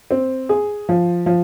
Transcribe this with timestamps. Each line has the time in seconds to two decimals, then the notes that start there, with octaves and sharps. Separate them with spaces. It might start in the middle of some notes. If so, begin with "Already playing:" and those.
0.11 C4
0.49 G#4
0.89 F3
1.26 F3